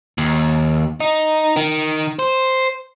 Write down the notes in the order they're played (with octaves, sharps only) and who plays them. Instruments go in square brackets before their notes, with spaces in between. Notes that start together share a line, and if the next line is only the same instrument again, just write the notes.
[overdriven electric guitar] D#2
D#4
D#3
C5